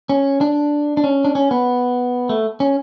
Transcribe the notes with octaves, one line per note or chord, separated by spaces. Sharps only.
C#4
D4
D4
C#4
D4
C#4
B3
A3
C#4